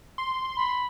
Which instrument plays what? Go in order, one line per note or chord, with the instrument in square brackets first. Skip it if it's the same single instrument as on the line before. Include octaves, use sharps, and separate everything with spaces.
[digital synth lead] C6
[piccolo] B5